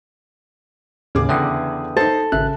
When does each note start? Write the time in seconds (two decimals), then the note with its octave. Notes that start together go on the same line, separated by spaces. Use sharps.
1.15 D#2 A2 C#3 G#4 D6
1.29 E2 D3 E5 G5 D#6
1.97 D#4 A4 C5
2.32 G#1 C#3 E5 F#6